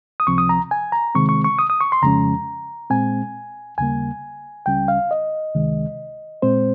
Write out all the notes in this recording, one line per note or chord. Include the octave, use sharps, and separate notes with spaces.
D#6
C#2 C3 F3 C4 C#6
D#6
A#5
G#5
A#5
C3 D#3 G#3 C4 C#6
C#6
C#6
D#6
D#6
C#6
C6
F2 C#3 F3 G#3 C#4 A#5
A#2 G#3 C4 G#5
D#2 C#3 G3 A#3 G#5
C#2 C#3 G3 C#4 G5
F5
D#5
C#2 C3 D#3 G#3
A#2 G#3 C4 C5